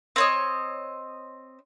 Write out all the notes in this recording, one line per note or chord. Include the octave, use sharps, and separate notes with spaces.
C4 C#5 D#5